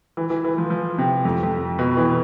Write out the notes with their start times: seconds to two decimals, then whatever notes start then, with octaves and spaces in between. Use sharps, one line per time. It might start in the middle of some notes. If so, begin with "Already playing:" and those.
0.17 E3
0.30 E3
0.44 E3
0.58 F3
0.70 F3
0.98 C3
1.25 F2
1.43 F2
1.79 B2
1.97 E3